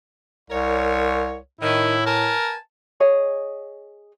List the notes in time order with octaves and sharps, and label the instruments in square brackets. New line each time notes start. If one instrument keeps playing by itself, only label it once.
[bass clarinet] C2 [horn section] A#4 C#5
[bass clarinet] A2 [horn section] D#3 [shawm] E4
[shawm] A#4 [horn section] B4 G#5 A5
[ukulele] G#4 C#5 D#5